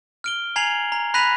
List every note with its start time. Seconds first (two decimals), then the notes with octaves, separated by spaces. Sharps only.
0.24 F6 D7 G7
0.56 G#5 A#5 G#6 C7 F7 F#7
0.92 A#5
1.14 B5 F#6 A#6 B6 D#7 F7